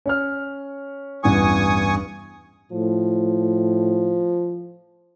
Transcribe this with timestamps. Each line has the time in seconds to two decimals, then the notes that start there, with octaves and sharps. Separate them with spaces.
0.06 C#4 C#5 F6
1.24 A1 E2 G2 G#5 C#6 D#6
2.72 A2 F3